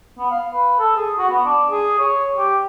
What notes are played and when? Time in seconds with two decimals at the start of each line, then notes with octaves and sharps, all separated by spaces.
0.18 B3
0.31 F5
0.53 B4
0.79 A4
0.96 G#4
1.18 F#4
1.30 B3
1.45 D4
1.70 G#4
1.99 C#5
2.37 G4